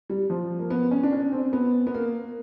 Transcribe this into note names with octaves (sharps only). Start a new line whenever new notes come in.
G3
F3
A#3
B3
C#4
D4
C#4
C4
B3
B3
A#3